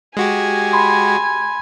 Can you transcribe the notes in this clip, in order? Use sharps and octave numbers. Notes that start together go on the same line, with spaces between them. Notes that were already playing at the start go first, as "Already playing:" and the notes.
G#3 F#4 G4 G#5
B5 C6